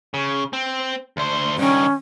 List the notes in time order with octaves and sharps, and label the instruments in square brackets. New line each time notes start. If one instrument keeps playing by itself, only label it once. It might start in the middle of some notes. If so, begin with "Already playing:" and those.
[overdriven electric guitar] C#3
C4
D2 C5
[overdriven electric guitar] G2 D#3 [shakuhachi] C#4